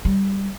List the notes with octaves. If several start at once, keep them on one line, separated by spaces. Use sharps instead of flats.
G3